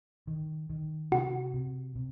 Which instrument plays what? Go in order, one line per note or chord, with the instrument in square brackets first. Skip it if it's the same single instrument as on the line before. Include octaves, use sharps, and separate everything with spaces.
[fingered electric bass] D#3
D#3
[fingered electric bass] C3 [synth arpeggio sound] F#4
[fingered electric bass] C3
C3